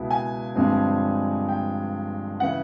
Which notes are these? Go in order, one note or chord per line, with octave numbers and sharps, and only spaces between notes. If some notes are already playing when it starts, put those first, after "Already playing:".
Already playing: C#2 B2 G#3 E4
G#5
G2 D3 F3 G#3 C4
G5
C#3 E3 F#5